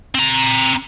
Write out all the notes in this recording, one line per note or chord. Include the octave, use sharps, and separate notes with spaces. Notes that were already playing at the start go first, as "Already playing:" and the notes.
C4 A#5